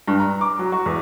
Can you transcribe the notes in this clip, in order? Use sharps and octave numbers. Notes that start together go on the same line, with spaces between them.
G2
A#5
D6
F#3
F#4
E2